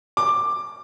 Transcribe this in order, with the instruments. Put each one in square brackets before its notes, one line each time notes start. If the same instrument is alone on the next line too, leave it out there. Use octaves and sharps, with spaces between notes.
[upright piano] D6